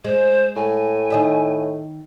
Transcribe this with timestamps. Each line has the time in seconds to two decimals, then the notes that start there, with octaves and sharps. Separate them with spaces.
0.05 G#3 C5
0.56 A2 G#5
1.10 D#3 D#5 E5